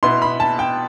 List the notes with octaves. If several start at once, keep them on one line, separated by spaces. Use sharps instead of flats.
B2 B3 E4 C6
B5
A5
G5